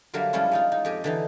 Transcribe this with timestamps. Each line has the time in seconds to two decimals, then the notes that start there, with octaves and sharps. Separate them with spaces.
0.14 D3 F#3 G3 A#3 A#4 E5
0.33 F3 G3 G#3 C#4 E4 F4
0.51 G#3 D#4 F4
0.72 D#4
0.85 F2 G4 G#5
1.04 D3 E3 D#4